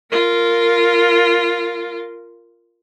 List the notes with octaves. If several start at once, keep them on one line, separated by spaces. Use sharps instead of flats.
F4 A#4